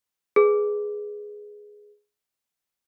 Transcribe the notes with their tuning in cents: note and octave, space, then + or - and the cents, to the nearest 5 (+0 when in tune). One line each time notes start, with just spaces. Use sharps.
G#4 +0 B4 +0